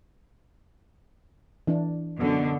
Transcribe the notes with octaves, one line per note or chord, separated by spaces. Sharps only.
E3 D4
F#2 B2 D3